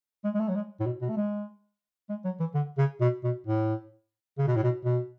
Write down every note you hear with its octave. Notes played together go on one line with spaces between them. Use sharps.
G#3
G#3
A3
F#3
G#3
A2
B2
B2
A3
G#3
G#3
F#3
E3
D3
C#3
B2
B2
A2
C#3
B2
A2
B2
B2